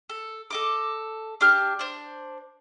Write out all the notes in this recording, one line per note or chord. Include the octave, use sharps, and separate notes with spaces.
A4
A4 D#5 D6
D4 G4 F6 F#6
D4 C5